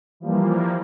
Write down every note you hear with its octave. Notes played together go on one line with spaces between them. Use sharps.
E3 F3 G3 A#3